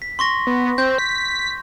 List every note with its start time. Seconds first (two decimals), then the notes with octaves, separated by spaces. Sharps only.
0.02 B6
0.19 C6 C#6 A#6
0.47 B3
0.78 C4 G6
0.98 B6